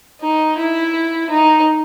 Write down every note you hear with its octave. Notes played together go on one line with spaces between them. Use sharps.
D#4
E4
D#4